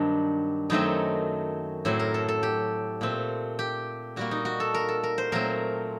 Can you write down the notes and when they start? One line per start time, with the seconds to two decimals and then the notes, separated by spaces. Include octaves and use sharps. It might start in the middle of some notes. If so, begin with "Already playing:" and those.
Already playing: G2 D#3 F#3 C4 D4
0.70 F#2 D#3 F#3 A3 C4 D#4
1.85 A2 F#3 C4 C5
1.99 A#4
2.14 A4
2.28 A4
2.43 G4
3.01 A#2 A3 C4
3.59 G4
4.16 A#2 G3 A#3 F#4
4.31 D#4
4.45 F#4
4.60 A4
4.74 A#4
4.89 A4
5.03 A#4
5.18 C5
5.32 A#2 F#3 A3 C4 A#4